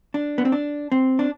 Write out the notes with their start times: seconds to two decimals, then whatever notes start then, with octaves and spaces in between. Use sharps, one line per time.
0.14 D4
0.38 B3
0.45 C4
0.52 D4
0.92 C4
1.19 D4